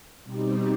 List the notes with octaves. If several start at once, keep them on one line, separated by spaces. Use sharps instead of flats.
B2 G3 C4 D#4 G4